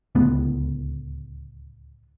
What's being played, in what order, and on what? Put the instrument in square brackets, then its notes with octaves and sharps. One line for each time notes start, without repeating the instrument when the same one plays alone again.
[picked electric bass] D1 C#2 A2 B3